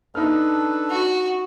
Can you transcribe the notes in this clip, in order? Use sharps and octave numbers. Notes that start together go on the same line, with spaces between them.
D4 D#4 A4 B4 F6
F#4